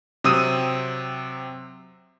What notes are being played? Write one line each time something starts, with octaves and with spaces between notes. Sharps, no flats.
C3 F#3 C4 D#6 E6 D#7